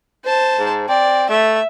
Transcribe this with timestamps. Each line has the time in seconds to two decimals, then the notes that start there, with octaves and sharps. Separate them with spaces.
0.25 C5 A5
0.59 G#2
0.88 C4 D5
1.29 A3 E5